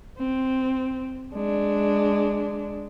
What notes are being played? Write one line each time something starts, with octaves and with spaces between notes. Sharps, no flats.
C4
G#3 D4